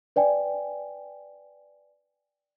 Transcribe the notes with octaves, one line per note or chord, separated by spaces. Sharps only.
B4 D5 G5 G#5